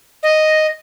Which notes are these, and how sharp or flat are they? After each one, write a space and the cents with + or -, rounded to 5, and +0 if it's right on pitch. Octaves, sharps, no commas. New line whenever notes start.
D#5 -5